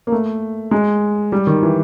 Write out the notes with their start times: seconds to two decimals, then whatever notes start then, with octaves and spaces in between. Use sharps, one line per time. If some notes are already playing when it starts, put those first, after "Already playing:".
0.07 A#3
0.12 A3
0.71 G#3
1.32 G3
1.47 D#3
1.63 E3